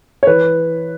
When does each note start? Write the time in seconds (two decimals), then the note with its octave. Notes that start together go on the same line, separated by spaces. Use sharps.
0.23 C#5
0.27 E3 B4